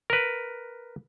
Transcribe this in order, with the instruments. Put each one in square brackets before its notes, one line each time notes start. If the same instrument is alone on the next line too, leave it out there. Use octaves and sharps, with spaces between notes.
[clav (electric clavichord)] A#4 B4